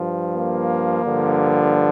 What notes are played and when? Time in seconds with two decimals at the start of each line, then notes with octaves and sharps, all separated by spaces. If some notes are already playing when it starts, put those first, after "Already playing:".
Already playing: G2 F3
0.33 A#3
1.03 G2 D3 F3